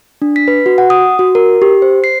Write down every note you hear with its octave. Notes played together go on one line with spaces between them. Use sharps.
D4
B6
B4
F#4
F#5
D#6
F#4
A#4
G4
C5
C7